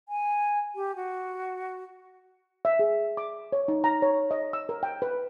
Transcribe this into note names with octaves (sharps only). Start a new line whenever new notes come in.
G#5
G4
F#4
E5
G#4
D6
C#5
D#4
A#5
C#5
D#5
E6
A#4
G5
B4